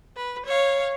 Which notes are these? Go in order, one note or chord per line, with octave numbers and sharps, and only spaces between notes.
B4
C#5 F5